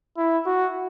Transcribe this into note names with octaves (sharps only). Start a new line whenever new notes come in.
E4
F#4